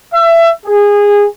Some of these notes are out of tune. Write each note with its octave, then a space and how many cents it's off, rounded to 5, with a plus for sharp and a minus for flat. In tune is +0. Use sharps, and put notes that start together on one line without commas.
E5 +25
G#4 -20